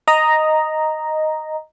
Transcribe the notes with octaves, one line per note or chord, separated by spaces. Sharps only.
D#5 A#5